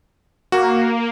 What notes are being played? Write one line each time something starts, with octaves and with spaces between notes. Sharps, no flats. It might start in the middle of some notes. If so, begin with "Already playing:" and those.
A#3 F#4